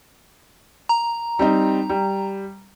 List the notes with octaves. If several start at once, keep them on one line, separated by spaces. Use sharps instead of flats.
A#5
G3 C4 D#4
G3